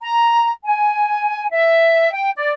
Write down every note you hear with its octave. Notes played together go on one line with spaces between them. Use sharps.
A#5
G#5
E5
G5
D5